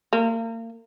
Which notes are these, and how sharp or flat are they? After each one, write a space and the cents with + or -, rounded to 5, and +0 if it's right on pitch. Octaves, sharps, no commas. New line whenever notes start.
A#3 -35